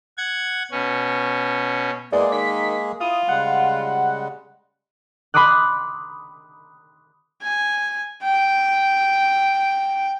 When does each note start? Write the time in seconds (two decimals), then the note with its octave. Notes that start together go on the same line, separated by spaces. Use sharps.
0.18 F#5 G#6
0.71 B2 C#4
2.12 E2 G#3 A#3 G#4 D5
2.32 D#3 B6
3.01 E4 F4 D#6
3.28 C#3 G3 G#3 F#5
5.34 B5 C6 D6 D#6 F#6
7.42 G#5
8.23 G5